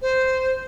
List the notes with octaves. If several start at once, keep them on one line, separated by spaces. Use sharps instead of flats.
C5